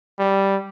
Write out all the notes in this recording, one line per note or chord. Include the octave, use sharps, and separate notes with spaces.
G3